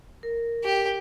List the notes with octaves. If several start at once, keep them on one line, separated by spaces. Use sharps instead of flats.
A#4
G4